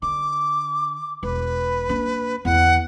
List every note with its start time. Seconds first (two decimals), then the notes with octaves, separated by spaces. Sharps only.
0.02 D3 D6
1.23 E1 B4
1.89 A#3 D4
2.45 E2 D3 F#5